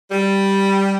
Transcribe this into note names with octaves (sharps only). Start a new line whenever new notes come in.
G3